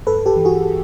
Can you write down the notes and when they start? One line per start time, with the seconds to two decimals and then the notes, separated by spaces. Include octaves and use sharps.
0.07 G2 A4 B4
0.26 G4 A4
0.36 E3
0.45 F#4 G#4